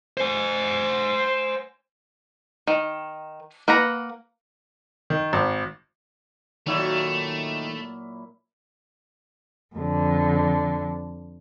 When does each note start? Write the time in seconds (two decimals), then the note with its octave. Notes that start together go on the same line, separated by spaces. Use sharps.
0.17 C5 G#5
2.67 D#3
3.68 A#3 B4 F#5 A#5
5.10 D#3
5.33 G#1
6.67 A#2 D#3 F#3 A3 E4
9.76 F2 D3